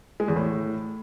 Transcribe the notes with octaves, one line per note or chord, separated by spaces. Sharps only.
G#3
E2
A2